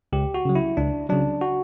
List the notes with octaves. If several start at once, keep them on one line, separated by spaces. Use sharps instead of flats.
C#2 G4
F#4
C#3 F#3
E4
C#2 D4
C#3 F#3 D4
F#4